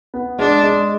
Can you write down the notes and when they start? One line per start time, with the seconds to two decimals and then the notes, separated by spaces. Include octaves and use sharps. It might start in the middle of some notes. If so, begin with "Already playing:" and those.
0.14 B3
0.39 G#3 D4
0.63 G#3